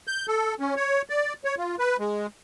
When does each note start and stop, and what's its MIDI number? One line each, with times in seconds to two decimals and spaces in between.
0.07 0.26 91
0.28 0.54 69
0.60 0.74 61
0.77 1.02 73
1.10 1.33 74
1.45 1.55 73
1.58 1.76 65
1.79 1.97 71
1.99 2.27 56